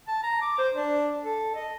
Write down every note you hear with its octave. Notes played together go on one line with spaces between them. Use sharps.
A5
A#5
D6
C5
D4
A4
D#5